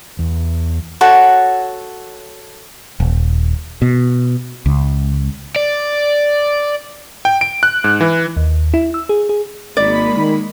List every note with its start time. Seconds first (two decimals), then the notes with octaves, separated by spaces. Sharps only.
0.19 E2
1.01 F#4 A4 C#5 F#5
3.00 D#1
3.82 B2
4.66 C#2
5.56 D5
7.25 G5
7.41 D7
7.63 F#6
7.84 G#2
8.01 E3
8.37 D#2
8.74 E4
8.94 E6
9.09 G#4
9.29 G#4
9.77 G#1 G#3 A#3 D5 B5
10.16 D#3